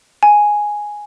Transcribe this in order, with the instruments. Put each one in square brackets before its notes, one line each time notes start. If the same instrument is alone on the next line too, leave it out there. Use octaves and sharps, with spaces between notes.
[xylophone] G#5